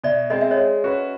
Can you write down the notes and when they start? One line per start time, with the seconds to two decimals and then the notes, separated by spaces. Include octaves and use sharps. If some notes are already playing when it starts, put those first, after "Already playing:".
0.04 B2 D5 E5
0.30 G#3 C4 D#5
0.41 E5
0.51 C#5 D#5
0.57 G#3
0.84 C#4 F#4 B4